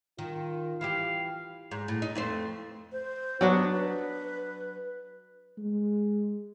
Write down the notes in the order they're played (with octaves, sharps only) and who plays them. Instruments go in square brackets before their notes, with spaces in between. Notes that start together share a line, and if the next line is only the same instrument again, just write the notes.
[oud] D#3 [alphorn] F4
[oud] E3 E4 G4 [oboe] F5
[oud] G#2
A2
D#4
F2 A3 C5
[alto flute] C5
[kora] F#3 D4 F#4 [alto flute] B3
[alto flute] B4
[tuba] G#3